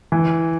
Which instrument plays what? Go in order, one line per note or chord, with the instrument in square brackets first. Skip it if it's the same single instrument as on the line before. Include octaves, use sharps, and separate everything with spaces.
[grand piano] E3